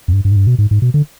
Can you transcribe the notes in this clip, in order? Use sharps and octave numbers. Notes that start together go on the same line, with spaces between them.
F2
G2
G2
G#2
G2
B2
G#2
G#2
B2
D3